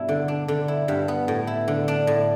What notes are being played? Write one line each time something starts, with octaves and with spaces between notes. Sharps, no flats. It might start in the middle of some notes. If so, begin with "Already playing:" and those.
Already playing: G2 B2 D4 E4
D3
D4
D3
E4
G2
B3
A2
E4
D3
D4
A2